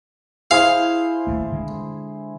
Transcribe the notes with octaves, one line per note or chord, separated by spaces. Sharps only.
E4 G#4 C5 F5
D#1 A3 A#3
D3 G#3